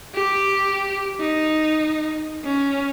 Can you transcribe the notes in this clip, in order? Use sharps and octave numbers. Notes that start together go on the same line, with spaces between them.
G4
D#4
C#4